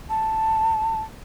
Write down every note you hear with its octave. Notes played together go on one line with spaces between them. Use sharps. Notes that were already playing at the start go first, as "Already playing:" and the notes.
A5